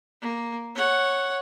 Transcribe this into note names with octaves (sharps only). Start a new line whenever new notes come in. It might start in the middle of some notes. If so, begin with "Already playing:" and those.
A#3
C#5 F#5